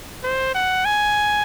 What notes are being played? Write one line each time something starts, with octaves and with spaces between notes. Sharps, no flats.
C5
F#5
G#5